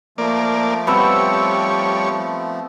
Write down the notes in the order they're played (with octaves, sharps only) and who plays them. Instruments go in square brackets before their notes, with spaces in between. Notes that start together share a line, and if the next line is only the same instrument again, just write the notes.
[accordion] F3 A3 [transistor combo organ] A#3 D5
[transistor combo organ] G3 C#5 [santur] B3 C4 C5